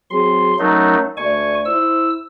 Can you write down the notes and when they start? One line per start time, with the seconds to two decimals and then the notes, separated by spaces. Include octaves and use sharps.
0.10 F#3 C4 G#4 C6
0.59 F#3 A3 C#4 D#4 A#4
1.17 D2 A3 D5 G#5 C#6
1.65 E4 C5 E6